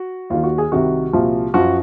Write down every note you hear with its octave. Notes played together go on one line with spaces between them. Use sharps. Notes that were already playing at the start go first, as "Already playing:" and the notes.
Already playing: F#4
D#2 D#3 F4
F#4
G#4
C2 C3 D#3 F#4
C2 A#2 F3
F#2 F3 F#4